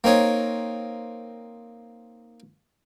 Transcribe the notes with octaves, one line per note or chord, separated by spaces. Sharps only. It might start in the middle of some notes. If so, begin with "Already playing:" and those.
A#3 C4 D#4 C#5